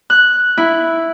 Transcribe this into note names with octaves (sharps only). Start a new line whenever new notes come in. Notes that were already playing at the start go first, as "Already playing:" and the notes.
F#6
E4